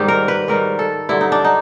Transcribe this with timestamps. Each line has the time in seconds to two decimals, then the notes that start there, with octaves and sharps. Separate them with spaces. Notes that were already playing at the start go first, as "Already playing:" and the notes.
Already playing: G#2 D#3 G3 G4
0.08 A#4
0.28 B4
0.48 G#2 D#3 G3 A#4
0.79 A4
1.09 G2 D3 F#3 E4
1.21 D#4
1.32 D4
1.45 D#4